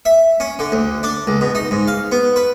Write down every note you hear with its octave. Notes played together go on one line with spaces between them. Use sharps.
E5
C#4
D3
D2
D4
C#2
B2
D#4
G#2
F5
B3
B4